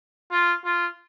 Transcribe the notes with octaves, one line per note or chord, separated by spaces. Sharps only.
F4
F4